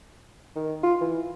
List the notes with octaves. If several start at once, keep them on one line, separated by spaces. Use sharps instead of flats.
D#3
F4
E3